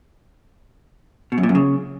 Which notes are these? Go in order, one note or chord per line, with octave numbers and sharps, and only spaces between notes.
B2
F#2
A#2
F#2
C#3